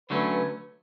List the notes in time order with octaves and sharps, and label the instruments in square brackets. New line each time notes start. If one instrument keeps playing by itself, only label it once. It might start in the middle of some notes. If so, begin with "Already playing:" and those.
[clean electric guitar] D3 F#3 A3 C#4 [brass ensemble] B4